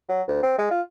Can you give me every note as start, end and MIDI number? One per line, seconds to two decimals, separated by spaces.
0.09 0.22 54
0.28 0.40 38
0.43 0.54 60
0.58 0.66 56
0.71 0.82 65